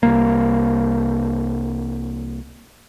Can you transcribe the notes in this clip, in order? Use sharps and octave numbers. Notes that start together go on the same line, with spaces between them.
C2 A#3